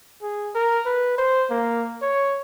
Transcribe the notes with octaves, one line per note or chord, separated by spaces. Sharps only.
G#4
A#4
B4
C5
A#3
C#5